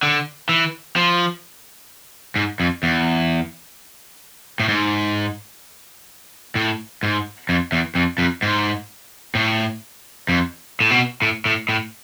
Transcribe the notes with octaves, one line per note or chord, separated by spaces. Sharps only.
D3
E3
F3
G#2
F2
E2
A2
G#2
A2
G#2
F2
E2
F2
F2
G#2
A2
F2
A2
B2
A2
A2
A2